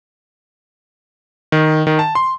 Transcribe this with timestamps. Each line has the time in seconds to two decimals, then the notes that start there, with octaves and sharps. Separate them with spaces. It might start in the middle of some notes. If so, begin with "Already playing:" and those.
1.52 D#3
1.87 D#3
1.99 A5
2.15 C6